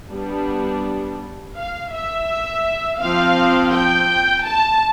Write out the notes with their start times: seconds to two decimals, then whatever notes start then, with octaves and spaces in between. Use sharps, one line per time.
0.11 G3 B3 D4
1.57 F5
1.93 E5
3.01 F3 C4 F5
3.73 G5
4.46 A5